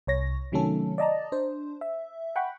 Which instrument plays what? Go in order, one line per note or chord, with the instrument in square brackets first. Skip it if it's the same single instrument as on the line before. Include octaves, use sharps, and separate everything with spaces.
[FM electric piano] C2 C#5 A#6
C3 D#3 F#3 A3 C#4 A4
D5 D#5 A5 A#5
D4 C5
E5
F#5 G5 B5 C#6